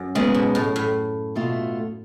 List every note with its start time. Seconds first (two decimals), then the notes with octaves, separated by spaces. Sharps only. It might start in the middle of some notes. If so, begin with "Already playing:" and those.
Already playing: F#2
0.15 G#2 C#3 G#3 B3
0.34 B2
0.55 A2
0.76 A2
1.35 B2 A3 F4